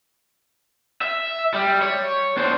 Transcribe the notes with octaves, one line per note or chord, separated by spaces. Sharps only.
E5
G3
C#5
D4 C5